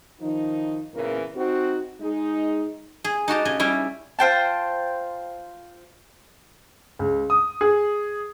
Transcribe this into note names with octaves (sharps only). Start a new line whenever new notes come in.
D#3 F3 D#4
E2 A#2 C#3 E3 A#4
C4 D#4 F#4
G#3 D#4
G#4
D#4 F#4 G4 A5
C#3 D#5 G#5
G3 C#4 E4 G5
F4 C5 G5 A5
C#2
D#6
G#4